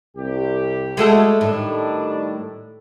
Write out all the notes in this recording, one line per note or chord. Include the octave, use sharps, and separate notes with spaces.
C2 G4
G#3 A3 F#4 G4 A4
A2 D#3 G3 D4